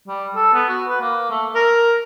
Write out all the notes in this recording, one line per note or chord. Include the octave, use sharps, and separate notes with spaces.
G3
A4
B3
F#4
B4
A#3
A3
A#4